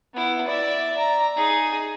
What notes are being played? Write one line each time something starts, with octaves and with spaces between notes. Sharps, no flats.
B3 E4
D5 E5
A#5
D#4 G#4